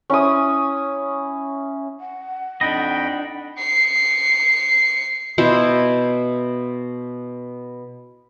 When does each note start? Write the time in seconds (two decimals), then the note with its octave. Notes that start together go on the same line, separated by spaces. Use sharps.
0.10 C#4 E4 D#6
2.00 F#5
2.61 F2 D4 D#4 D#5 G5 B5
3.58 C7 C#7
5.38 B2 E4 C5